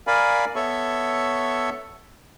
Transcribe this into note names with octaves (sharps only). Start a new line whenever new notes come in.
A#4 D5 F5 G#5 B5
B3 A4 C#5 E5 C#6